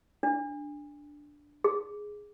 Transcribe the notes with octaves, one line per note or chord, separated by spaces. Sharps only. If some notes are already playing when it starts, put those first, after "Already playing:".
D4
G#4